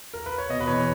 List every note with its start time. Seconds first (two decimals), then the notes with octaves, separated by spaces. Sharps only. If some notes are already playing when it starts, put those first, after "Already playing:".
0.14 A#4
0.26 B4
0.38 C#5
0.49 B2 D#5
0.61 B4
0.67 E2 C#5